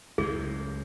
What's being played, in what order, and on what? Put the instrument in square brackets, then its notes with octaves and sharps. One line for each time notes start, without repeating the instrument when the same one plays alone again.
[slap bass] C#2 F#2 A2 [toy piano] G#4